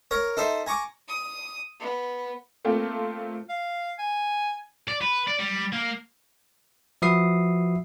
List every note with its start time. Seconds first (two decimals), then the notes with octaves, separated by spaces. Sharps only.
0.11 A#4 C#5 A#5
0.37 D#4 A4 C5 E5
0.66 G#5 A#5 C#6 D6
1.08 D#6
1.80 B3
2.65 A3 A#3 C4 F4 A4
3.49 F5
3.99 G#5
4.88 D5
5.02 B4
5.28 D5
5.39 G3
5.73 A#3
7.02 F3 F#4 B4 E5 D#6 C7